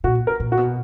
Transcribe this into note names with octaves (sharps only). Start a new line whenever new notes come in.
A#2 F#4
A#4
A#2
F#4
B2